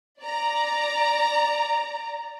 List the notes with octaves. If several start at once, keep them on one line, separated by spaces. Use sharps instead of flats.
D5 A#5